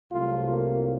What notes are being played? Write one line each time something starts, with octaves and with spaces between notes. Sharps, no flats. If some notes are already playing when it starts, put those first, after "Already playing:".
C2 C3 F#3 A3 F4
A#3